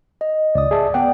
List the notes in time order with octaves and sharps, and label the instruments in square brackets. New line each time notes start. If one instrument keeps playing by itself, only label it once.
[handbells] D#5
[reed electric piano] C#2 [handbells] D5 D#6
[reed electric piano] G#4 E5 A5
[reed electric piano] B3 D5 F#5 [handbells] G5